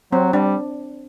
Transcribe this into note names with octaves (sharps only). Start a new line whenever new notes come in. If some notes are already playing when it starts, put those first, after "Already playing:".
F#3 C4
G3 D4